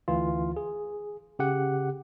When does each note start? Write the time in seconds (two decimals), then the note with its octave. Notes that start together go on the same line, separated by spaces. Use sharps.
0.08 D2 E3 F4
0.57 G#4
1.39 C#3 G4 F#5